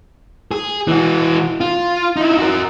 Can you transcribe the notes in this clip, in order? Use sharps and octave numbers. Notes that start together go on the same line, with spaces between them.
G#4
E3 F#4
F4
D#4 E4
F#4 A#4